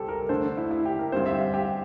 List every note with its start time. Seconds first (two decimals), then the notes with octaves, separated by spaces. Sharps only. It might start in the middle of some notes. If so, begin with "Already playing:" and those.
Already playing: C2 C3 G3 G4 A4
0.08 A#4
0.29 D3 A3 D4 A4 C5
0.57 E4
0.71 E4
0.85 G4
0.99 A#4
1.12 G2 D3 G3 C4 C5
1.26 E5
1.41 F5
1.54 G4